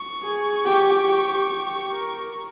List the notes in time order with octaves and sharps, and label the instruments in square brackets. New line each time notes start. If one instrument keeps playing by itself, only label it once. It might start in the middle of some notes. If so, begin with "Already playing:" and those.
Already playing: [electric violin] C#6
[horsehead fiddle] G#4
G4
G4
G4
A#4